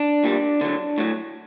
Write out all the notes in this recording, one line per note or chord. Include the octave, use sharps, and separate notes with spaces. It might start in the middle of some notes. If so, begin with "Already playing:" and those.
Already playing: D4
A#2 G3
D3 F#3
A2 F#3